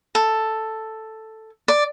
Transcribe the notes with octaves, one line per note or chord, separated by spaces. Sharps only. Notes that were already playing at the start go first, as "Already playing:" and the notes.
A4
D5